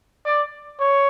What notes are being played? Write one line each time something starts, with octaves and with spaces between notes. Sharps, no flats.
D5
C#5